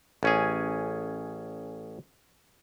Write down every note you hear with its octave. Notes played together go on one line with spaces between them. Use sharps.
A1 C#4 G#4